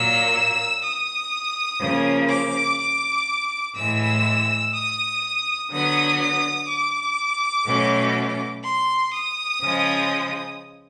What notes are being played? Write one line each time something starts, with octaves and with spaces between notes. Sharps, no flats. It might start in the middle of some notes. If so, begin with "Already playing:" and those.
Already playing: A#2 F#3 A#3 E6
D#6
C#3 F3 A#3
D6
D6
A2 E3 G#3 E6
D#6
D3 F#3 B3 D#6
D#6
D6
B2 F#3 A3 C#4
C6
D#6
C#3 F3 G#3